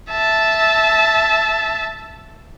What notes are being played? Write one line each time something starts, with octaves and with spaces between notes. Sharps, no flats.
E5 A5